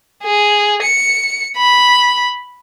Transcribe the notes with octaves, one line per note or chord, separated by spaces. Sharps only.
G#4
C#7
B5